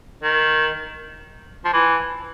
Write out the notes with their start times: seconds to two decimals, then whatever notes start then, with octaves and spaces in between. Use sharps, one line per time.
0.23 D#3
1.65 F3
1.73 E3